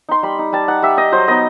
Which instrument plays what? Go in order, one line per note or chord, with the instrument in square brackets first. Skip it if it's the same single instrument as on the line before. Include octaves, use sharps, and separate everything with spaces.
[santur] D#4 C6
G3 B5
D#4
G3 A5
D#4 F#5
G3 E5
D#4 D#5
F#3 C5
B3 D#4 D#5